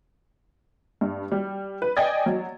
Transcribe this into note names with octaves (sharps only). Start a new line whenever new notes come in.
G2
G3
B4
D5 D#5 G5 G#5 G#6 A6
F#3